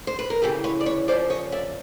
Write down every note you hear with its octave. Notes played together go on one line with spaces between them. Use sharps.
C5
B4
A#4
D2 C#3 E3 G4 A4
B4 C#5
D5
B4 C#5
F#2 C#3 F3 C5 D5
C#5 D#5
D5 E5